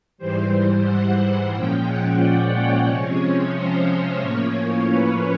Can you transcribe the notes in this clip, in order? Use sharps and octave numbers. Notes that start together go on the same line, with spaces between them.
G#2 E3 G3 C5
C5
F#5
F#5
A#2 F3 G#3 C#4 G5
F#5
D5
C#5
C3 F3 G#3 C#4
C5
C5
A2 F3 A#3 C#4 C#5
B4